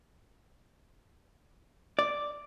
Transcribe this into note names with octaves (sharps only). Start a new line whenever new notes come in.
D5